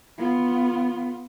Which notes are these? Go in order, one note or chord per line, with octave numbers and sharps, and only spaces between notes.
B3 F4